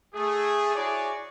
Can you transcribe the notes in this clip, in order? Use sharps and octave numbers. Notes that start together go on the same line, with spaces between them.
A3 G#4
E4 F#4 G#4 C#5 D5 D6